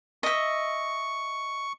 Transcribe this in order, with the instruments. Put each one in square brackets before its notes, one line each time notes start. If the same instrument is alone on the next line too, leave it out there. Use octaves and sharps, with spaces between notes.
[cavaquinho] D#5 E5 [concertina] C#6